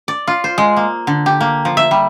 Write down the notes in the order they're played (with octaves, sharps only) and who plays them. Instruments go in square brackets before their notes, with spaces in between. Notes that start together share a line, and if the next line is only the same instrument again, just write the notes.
[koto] D5
F4
C5
G#3
A#3
D3
G4
A#3
F3
E5
G3